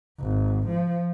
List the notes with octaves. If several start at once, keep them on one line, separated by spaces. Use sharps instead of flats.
G#1
F3